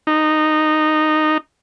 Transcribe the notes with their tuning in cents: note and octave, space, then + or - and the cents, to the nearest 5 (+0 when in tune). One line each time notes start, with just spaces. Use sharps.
D#4 -10